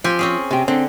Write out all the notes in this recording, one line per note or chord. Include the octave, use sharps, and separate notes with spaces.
F3 C4 G4 G#5
C4 C#4 G#4
C3 G4
D3 C4